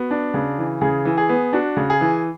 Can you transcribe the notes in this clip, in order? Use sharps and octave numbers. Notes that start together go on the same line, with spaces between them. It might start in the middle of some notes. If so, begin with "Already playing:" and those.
Already playing: B3 F#4
D4
C#3
E3
C#3 G#4
E3
G#4
B3
D4 F#4
C#3
G#4
E3